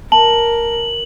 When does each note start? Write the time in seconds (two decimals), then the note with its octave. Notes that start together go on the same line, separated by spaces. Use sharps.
0.12 A#4 A5 F#7